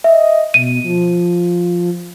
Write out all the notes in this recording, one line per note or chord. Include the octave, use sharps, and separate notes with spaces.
D#5 E5
B2 D#7
F3